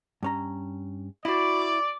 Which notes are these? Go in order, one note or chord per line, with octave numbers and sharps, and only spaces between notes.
G2 C#4 A#5
E4 F#4 D5 B5
D6